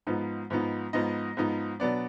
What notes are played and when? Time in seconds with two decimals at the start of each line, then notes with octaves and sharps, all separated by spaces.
0.07 G#2 F3 B3 D#4
0.50 G#2 F3 B3 D#4
0.93 G#2 F3 B3 D#4 D#5
1.37 G#2 F3 B3 D#4
1.80 B2 F#3 B3 D4 D5